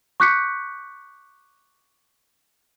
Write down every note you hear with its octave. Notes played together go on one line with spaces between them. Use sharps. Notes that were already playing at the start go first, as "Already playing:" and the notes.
C#6 D6 F#6 G6 B6 C#7